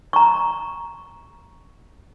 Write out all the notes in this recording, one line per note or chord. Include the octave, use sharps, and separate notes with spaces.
A#5 C#6